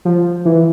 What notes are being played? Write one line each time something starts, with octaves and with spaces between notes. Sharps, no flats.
F3
E3